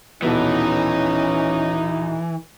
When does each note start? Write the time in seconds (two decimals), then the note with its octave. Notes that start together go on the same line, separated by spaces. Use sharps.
0.22 D#1 B2 E3 B3 C#4 D#4